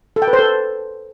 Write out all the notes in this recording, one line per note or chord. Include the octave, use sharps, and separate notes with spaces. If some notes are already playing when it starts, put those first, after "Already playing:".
A4
G5
B4
C5
A4